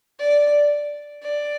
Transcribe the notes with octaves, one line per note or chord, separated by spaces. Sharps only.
D5
D5